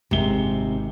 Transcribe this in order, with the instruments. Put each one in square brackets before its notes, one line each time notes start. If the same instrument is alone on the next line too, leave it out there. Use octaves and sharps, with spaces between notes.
[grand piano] G#1 G#2 G7 [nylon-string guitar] C3